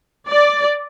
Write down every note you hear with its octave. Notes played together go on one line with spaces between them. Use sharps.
D5